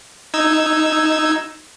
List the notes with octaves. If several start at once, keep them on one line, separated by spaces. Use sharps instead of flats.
D#4 E6 G#6